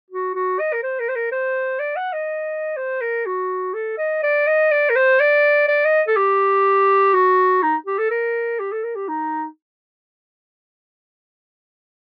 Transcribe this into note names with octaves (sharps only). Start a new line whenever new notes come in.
F#4
F#4
D#5
A#4
C5
A#4
C5
A#4
C5
D5
F#5
D#5
C5
A#4
F#4
A4
D#5
D5
D#5
D5
A#4
C5
D5
D5
D#5
A4
G4
F#4
D#4
G4
A4
A#4
G4
A4
A#4
G4
D#4